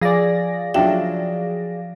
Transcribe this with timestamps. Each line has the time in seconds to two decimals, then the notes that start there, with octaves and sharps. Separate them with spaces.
0.01 F3 G#4 D5 F5 A#6
0.74 F#3 D4 F4 E5 G5